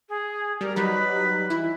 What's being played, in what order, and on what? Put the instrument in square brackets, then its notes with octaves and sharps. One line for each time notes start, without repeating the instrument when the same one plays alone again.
[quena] G#4
[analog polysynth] G3 [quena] A#4
[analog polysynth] F#3 G3 D#4 [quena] B4
[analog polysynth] E3 E4